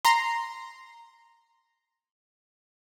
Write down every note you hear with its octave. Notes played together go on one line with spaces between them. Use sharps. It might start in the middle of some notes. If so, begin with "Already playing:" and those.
A#5 C6